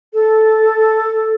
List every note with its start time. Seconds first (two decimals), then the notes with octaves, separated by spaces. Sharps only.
0.14 A4